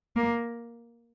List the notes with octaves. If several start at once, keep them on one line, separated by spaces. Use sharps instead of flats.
A#3